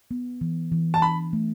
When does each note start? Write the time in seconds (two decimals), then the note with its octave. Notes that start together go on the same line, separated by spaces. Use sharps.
0.11 B3
0.41 E3
0.72 E3
0.94 A5
1.02 D4 B5
1.33 A3